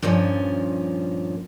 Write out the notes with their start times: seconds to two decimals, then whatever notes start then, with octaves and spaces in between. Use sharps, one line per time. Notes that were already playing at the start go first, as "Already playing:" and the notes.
0.02 G2 A#2 D#3 F3 C#4